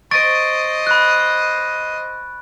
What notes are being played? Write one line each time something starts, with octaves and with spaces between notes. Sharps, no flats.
C5 D#5 C#6 A6 D7
B5 F#6